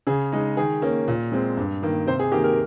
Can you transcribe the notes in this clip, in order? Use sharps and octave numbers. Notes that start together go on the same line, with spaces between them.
C#3 G#4
G#3 D#4
D#3 G#4
A#3 C#4
A#2
G#3 C4
G2
D#3 A#3
C3 C5
G#4
D#3 A#3 G4
A#4